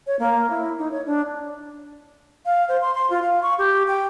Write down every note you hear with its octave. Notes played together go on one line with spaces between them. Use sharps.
C#5
A#3
E4
D#4
C#5
D4
F5
C5
C6
C6
F4
F5
C#6
G4
G5